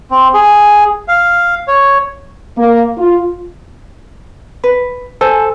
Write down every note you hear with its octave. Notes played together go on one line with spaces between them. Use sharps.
C4
G#4
F5
C#5
A#3
F4
B4
A4 C5 G#5